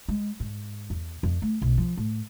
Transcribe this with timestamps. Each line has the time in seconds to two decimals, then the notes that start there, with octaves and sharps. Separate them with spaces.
0.09 G#3
0.40 G#2
0.90 E2
1.23 F2
1.42 A3
1.62 B1
1.78 F3
1.97 A2